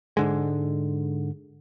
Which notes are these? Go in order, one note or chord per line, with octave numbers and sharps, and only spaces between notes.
G#2 D3 G#3